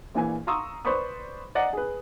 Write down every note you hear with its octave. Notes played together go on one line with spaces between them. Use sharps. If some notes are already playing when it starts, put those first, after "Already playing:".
A#1 A#2 E3 G#5
F5 A#5 C6 C#6 D#6 E6
B4 C5 D5 B5 C#6 D#6
D5 D#5 F#5 A#5
G#4 B4